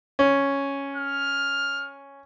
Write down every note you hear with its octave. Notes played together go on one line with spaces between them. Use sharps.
C#4
F6